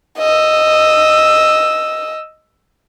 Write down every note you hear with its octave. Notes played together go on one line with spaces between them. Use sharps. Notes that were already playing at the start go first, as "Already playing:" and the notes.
D#5 E6